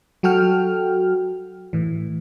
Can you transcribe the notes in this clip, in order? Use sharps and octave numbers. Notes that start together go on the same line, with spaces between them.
F#3 F#4 A4 G5 F6
A2 E3